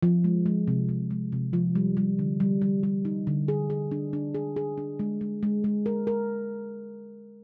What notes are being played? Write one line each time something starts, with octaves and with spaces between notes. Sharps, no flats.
F3
G#3
G#3
C3
C3
G#3
C3
F3
G3
G3
D3
G3
G3
G3
D#4
D3
G#4
G#4
D4
D4
G#4
G#4
D4
G#3
G#3
G#3
G#3
A#4
A#4